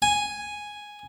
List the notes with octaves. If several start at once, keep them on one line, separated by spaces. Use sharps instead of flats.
G#5